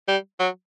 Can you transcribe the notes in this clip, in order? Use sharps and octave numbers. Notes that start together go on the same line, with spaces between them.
G3
F#3